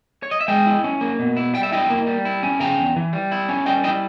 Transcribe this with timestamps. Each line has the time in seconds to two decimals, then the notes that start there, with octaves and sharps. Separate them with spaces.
0.23 C#5
0.31 D#5
0.41 E5
0.48 G#3 D#5 G5
0.66 E4
0.84 C#4
1.01 A#3
1.19 B2
1.37 E4
1.54 G3 G5
1.63 E5
1.72 E4 D#5 G5
1.90 A#3
2.07 G3
2.25 E4
2.43 C#4
2.60 C#3 G5 A#5
2.78 E2
2.96 E3
3.13 G3
3.32 E4
3.49 C#4
3.66 G3 D#5 G5
3.83 E4 D#5 G5